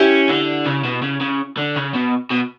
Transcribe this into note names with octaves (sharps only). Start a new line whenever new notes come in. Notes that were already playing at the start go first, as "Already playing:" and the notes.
Already playing: C#4 E4 G4
D3
C#3
B2
C#3
C#3
D3
C#3
B2
B2